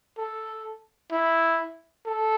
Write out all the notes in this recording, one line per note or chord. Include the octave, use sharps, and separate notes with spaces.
A4
E4
A4